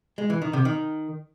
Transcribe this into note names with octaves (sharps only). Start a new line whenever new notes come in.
G#3
E3
D#3
C3
D#3